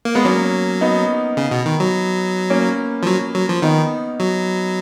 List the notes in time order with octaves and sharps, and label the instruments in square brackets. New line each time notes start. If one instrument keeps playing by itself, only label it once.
[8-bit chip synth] A#3
[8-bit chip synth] G#3 [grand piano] B3
[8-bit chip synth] F#3 [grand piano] A#3 C#4
[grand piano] B3 D#4
[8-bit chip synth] C#3
B2
D#3
F#3
[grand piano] A#3 C#4
[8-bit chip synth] F3
F#3
F#3
F3
[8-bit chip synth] D#3 [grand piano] B3 D#4
[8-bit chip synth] F#3